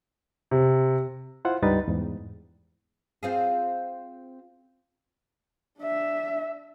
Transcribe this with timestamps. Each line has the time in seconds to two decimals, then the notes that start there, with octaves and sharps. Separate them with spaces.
0.51 C3
1.45 E4 F4 C5 F#5
1.63 C#2 G2 G3 D#4 B4 A6
1.88 E2 G#2
3.23 C4 F4 G#4
5.79 D4 E5